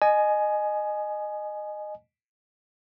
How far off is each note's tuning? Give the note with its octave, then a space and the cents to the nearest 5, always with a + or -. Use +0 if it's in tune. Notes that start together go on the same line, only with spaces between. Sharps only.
D#5 -20 G#5 +15